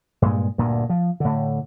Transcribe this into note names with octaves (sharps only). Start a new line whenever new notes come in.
G2 A#2 G#3
D2 G2 A#2
F3
A2 D3